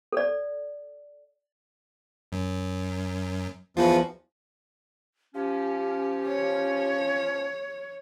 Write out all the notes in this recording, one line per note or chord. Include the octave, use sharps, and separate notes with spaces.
A4 D5
F#2
E2 F3 F4 F#4 B4
F3 C#4 G4
C#5